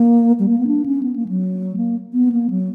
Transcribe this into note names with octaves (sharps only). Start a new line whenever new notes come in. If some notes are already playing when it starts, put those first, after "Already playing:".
Already playing: A#3
G3
A#3
B3
D4
C#4
B3
A#3
F#3
A#3
B3
A#3
F#3